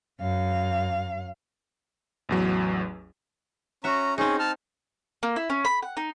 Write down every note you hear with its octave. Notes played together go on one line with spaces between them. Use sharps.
F#2 F5
A1 E2 F#3
C#4 F#4 E5 A#5
C4 C#4 D#4 G#4
A5 F6
A#3
E4
C#4
B5
F#5
D#4